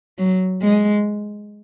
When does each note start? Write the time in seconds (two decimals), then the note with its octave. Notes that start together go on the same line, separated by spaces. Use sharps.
0.18 F#3
0.62 G#3